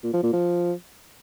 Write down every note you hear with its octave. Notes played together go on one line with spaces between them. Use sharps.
A#2
F3
A#2
F3